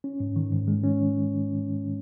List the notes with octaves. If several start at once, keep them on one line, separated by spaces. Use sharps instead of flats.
C#4
G#2
D#3
G#2
G#3
C#4